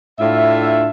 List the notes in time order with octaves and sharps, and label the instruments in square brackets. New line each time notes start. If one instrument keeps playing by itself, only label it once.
[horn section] A2 D4 F4 E5